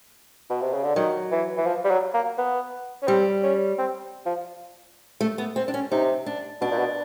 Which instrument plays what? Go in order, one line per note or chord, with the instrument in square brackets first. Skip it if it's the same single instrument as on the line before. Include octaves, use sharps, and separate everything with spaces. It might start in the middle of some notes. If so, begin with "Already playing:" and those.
[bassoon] B2
C3
C#3
D3
[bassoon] D#3 [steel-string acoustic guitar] F#3
[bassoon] E3
E3
F3
G3
F#3
A#3
B3
C#4
[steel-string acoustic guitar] G3 [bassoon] C4
[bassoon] C#4
C4
F3
[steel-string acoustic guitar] A3
B3
C4
D4
C#4
[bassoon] C3 [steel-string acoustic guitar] D#4
[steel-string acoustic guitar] D4
[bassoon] B2 [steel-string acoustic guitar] D4
[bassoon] A#2
B2